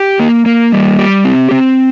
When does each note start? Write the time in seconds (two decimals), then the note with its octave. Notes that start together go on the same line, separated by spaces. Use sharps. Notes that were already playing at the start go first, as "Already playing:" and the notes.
Already playing: G4
0.20 A#3
0.46 A#3
0.72 G3
0.99 G4
1.24 C4
1.51 C4